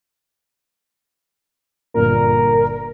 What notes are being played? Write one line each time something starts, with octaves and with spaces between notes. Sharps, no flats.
G1 A#2 A#3 A#4